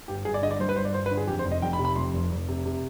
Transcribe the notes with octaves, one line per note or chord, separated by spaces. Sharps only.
G1 G4
G1 G#4
D5
D3 D#5
D5
G2 C5
B4
G1 C5
D5
G1 C5
B4
D3
G#4
F2 G4
C5
F1
D#5
F1 G5
B5
C3
B5
F2 C6
F1
F1
C3
C3